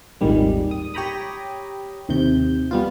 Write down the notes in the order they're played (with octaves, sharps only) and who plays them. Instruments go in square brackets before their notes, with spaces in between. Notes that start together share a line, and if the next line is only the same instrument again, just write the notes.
[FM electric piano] G#1 D#2 A#2 D#3 G3 G#3
D#6
G4 C#5 G5 A#5 B5 D#6
D#2 C3 G6
G3 B3 F4